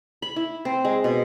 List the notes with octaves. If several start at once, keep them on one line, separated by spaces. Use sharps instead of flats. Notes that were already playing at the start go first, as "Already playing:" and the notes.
B5
E4
C4
G#3
B2